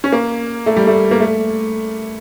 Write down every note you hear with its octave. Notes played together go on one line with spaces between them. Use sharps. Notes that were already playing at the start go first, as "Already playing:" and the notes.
C#4
A#3
A3
G3
A3
A#3
A3